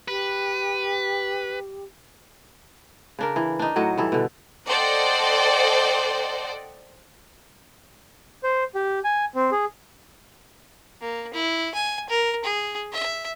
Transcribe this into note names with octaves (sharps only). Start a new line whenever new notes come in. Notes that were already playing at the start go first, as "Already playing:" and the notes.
G4 B4
C#3 D4 A#4
E3
D4 D#4
A2 F#3 F#4 D#5
G2 E3 A4
B2 D3
A4 C5 D5 D#5 F#5 G5
C5
G4
G#5
C4
G#4
A#3
E4
G#5
A#4
G#4
E5